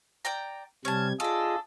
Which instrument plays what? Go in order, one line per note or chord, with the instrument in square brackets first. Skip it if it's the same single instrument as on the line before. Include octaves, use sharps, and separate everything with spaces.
[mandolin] D5 G5 A#5
[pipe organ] C3 G3 G#6 [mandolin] C#4 A5
[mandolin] D4 A4 [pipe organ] F4 G#4 D#5